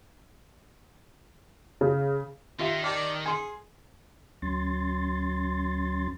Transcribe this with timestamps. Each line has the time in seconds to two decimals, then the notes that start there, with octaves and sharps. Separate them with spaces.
1.81 C#3
2.59 D#3 F4 G4 E5
2.84 G4 D5 A5 F6
3.26 G#4 G#5 C6
4.42 D2 F#3 C#4 C6 A6